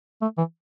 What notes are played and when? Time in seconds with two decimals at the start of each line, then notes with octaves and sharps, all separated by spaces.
0.22 A3
0.38 E3